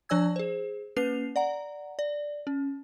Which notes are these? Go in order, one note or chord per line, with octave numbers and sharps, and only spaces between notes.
F3 D4 D5 G#5 E6 G#6
G#4 C5
A#3 C#4 B4 C7 F7
D5 F#5 A#5
D5
C#4